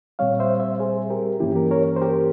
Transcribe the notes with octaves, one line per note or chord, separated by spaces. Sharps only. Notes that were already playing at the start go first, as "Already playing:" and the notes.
A#2 G3 C4 C#5 F5
C5 E5
C5 E5
G#4 C5
G4 A#4
G2 E3 A#3 C#4 E4 G4
G4 A#4
A#4 C#5
C5
G4 A#4